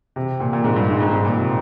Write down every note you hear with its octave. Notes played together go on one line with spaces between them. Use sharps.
C3
A#2
A#2
G#2
G2
G#2
G#2
G#2
A#2
C3